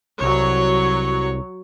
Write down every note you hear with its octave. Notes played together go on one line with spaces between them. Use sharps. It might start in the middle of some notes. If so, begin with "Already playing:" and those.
C2 F#3 C#5